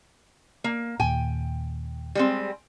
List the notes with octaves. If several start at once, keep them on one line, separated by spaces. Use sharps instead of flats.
A#3
D#2 A#2 G5 G#5
G3 G#3 C4